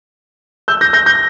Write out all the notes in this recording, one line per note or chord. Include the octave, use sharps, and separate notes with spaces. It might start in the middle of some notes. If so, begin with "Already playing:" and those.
E6 G6
G6 A#6
G6 A#6
G6 A#6